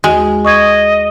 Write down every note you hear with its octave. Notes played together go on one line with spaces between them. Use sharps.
D#2 G#3 F#4 D#5
D#5 C#6 D#6 G#6